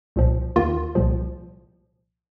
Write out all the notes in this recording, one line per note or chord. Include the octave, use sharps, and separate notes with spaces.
C2 A#2 F3
D#2 D#3 F4
C2 A#2 F3